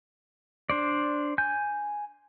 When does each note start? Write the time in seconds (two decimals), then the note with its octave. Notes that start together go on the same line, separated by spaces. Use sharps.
0.70 D4 C5 D5
1.38 G#5 G6